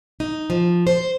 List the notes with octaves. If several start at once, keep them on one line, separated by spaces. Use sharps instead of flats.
D#4
F3
C5